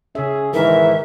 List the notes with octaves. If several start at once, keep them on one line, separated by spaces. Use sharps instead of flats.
C#3 C#4 G#4 E5
G#2 D#3 E3 A#4 E5